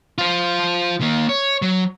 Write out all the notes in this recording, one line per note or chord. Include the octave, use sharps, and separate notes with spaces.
F4 C5
D#3 A#3
C#5
F#3